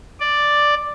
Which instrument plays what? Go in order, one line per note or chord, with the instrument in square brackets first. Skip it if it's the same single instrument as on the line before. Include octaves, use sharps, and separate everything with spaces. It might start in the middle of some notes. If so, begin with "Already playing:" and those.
[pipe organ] D5